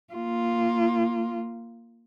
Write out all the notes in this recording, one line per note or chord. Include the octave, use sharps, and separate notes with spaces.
A#3 F4